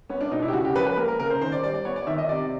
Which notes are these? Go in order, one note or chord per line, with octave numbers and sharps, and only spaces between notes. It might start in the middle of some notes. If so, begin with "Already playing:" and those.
B3 C#4
D4
B2 D#4
E4
G4
C#3 F#4
G4
F3 B4
B4
A#3 A#4
A#4
C#3 A#4
C5
D#3 C5
D5
G3 D5
D5
B3 C#5
D5
D#3 E5
D#5
C3 D5